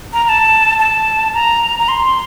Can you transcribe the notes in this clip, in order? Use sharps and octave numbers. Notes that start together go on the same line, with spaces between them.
A#5
A#5
A5
A5
A#5
A#5
C6